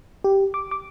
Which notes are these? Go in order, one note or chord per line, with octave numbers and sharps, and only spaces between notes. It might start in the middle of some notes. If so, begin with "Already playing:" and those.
G4
D6
D6